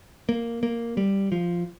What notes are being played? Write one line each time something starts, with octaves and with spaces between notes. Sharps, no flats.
A#3
A#3
G3
F3